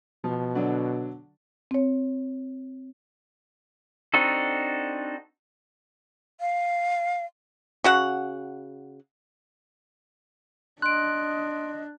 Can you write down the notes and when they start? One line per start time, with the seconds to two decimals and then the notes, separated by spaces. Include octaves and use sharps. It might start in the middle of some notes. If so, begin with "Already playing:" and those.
0.24 B2 F3
0.55 D3 F#3 D4
1.71 C4 C#5
4.14 C4 D4 D#4 F#4 A4
6.40 F5
7.84 C#3 F#4 F#5
10.82 D4 D#5 C6 F#6 D7